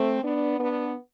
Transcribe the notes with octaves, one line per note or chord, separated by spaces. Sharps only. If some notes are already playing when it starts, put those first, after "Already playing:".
Already playing: A3 C4
B3 D4
B3 D4